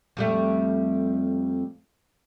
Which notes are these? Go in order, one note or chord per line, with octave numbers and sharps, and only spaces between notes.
F2 G3 A3